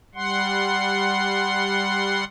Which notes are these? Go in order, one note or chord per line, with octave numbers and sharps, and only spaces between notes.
G3 F#5 C6